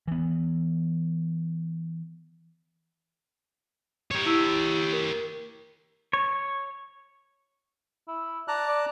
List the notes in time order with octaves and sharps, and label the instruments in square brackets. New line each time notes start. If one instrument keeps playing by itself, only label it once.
[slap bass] E3 B3
[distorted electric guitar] G4 C#5
[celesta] E4 E6
A#4
[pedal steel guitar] C#5
[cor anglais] E4
[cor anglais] D5 [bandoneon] A5 A#5 F#6
[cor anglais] D5